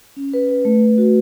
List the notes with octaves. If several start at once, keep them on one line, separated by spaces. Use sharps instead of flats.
C#4
B4
B4
A3
A3
F#4